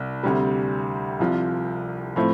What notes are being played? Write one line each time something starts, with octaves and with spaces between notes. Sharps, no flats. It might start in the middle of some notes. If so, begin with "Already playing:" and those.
Already playing: C2
D2 C3 G3
C2 C3 F3
A2 F3 A3 C4